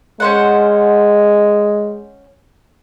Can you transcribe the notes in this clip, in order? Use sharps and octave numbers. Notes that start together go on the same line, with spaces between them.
G#3 C#4 C5 F#5